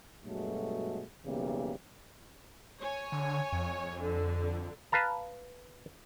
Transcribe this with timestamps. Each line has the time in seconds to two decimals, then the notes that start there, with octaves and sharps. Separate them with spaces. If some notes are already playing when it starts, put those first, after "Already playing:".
0.23 G2 B2 F#3 G#3 A3
1.26 B1 E2 C#3 E3 G3 A#3
2.80 C#5 G#5
3.12 D3
3.53 F2
4.01 D3
4.92 B4 F5 A5 A#5